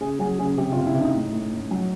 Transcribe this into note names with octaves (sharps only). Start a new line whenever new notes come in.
C#3 G#4
F#3 G#4
C#3 G#4
C3 G4
C3 F4
E4
C3
D#4
A2
A2
A2
F#3